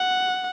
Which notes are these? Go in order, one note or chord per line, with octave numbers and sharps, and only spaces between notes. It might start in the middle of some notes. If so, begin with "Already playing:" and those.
Already playing: F#5